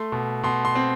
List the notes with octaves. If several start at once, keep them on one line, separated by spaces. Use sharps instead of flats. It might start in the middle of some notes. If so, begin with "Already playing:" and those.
Already playing: A3 C6
B2
B2 C6
C6
C4